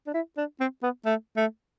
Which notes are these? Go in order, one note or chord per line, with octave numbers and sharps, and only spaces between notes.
D4
E4
D4
C4
B3
A3
A3